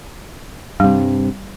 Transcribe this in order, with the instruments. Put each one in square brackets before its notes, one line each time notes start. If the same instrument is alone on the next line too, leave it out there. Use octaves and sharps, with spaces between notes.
[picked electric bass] G2 C3 [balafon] G3